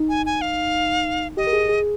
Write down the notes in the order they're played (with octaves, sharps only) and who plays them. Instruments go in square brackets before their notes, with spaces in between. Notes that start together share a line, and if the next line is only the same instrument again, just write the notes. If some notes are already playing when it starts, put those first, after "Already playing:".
Already playing: [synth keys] D#4
[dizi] G#5
G#5
F5
[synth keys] G4 [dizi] D#5
[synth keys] A#4
G#4
G#4